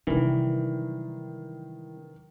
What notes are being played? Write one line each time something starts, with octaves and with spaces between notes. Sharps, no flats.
C3 D#3 E3 F#3 G3